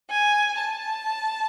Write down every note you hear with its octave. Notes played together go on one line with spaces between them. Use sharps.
G#5
A5